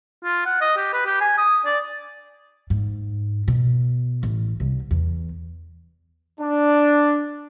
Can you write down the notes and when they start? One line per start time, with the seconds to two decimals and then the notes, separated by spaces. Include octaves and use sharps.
0.24 F4
0.46 F#5
0.61 D#5
0.77 G4
0.93 B4
1.06 G4
1.21 G#5
1.38 D#6
1.65 D5
2.70 G#2
3.48 B2
4.23 A1
4.60 C2
4.91 E2
6.40 D4